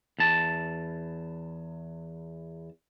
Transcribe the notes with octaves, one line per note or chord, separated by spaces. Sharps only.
E2 A5